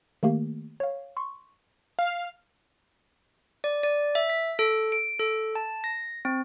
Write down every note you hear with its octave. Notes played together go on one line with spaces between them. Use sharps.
D#3 A3 A#3 G4
C#5 F5
C6 C#6
F5
D5
D5
E5
B6
A4
D7
A4
A5
A#6
C4